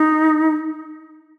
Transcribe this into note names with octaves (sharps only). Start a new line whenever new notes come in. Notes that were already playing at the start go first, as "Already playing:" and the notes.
Already playing: D#4